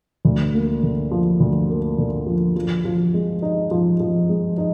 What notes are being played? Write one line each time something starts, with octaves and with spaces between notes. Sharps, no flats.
D2
A#3
D3
F3
D2
A#3
D3
F3
F3
F3
G#3
D#4
F3
F3
G#3
D#4